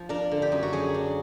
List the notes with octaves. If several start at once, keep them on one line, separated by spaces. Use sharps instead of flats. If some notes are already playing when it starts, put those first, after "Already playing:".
Already playing: F3
D4 A#4
D3
G4
F#2
F#4
F#3 G#4
D4